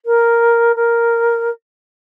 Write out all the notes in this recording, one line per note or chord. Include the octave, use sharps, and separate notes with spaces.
A#4
A#4